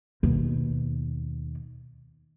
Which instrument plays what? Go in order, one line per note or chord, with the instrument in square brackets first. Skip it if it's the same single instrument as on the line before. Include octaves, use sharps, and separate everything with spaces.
[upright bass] D#2 B2